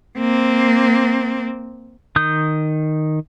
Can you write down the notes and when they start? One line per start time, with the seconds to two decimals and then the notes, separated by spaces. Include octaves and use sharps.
0.19 A#3 C4
2.16 D#3 D#6 G6